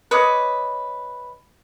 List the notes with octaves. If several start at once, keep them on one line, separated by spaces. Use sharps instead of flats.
B4 C#5 D#5 D6